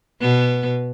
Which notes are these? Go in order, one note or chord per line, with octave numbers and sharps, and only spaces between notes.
B2 B3